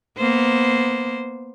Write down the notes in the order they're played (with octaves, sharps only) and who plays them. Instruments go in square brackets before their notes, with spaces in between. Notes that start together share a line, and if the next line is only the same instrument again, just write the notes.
[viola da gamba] A#3 B3 C5